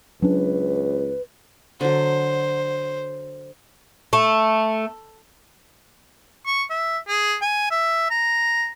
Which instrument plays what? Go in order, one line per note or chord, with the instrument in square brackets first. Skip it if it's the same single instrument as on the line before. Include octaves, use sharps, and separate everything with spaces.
[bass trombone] C#2 [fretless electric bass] F#3 C#4 D4 [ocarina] B4
[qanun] D3 F#3 [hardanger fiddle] C5
[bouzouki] A3
[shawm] C#6
E5
G#4
G#5
E5
A#5